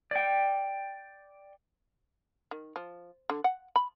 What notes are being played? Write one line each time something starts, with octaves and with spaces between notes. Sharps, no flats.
D5 G5
D#3
F3
D3
F#5
B5